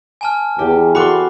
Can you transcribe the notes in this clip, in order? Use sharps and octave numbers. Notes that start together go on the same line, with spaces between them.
G#5 A5 F6
E2 G4
F#4 A4 B5 C6 D6